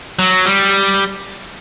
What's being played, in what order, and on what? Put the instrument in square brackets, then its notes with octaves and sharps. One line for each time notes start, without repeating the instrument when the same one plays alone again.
[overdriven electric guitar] F#3
G3